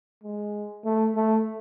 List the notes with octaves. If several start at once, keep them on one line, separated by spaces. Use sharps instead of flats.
G#3
A3
A3